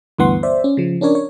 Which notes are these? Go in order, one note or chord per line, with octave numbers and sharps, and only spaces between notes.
D2 G2 E3 B3 F#5 C6
C5 D5 E5
C#4
C#3 F3
C#4 D4 A#4 C#5 D5
C#5